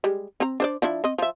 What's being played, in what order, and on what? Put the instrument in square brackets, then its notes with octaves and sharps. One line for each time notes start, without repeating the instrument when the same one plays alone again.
[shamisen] G3 G#3
C4 A#5
D4 C5 D5
F3 D4 E4
C4 D#5
F3 E5